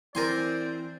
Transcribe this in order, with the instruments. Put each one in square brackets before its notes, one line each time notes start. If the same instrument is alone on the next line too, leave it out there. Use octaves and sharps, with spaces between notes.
[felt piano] E3 [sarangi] C4 [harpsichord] A#4 G#5 C6 [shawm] D5